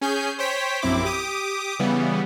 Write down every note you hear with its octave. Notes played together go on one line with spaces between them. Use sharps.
C#4 G#4 G#5 G6
C5 C#5 G5 B6
A#1 F#2 C4 E4 D6
G4 D6 D#6
C#3 E3 G3 B3